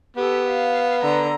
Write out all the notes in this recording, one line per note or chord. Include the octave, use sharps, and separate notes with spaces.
B3 G4 A4
F5
D3 A#5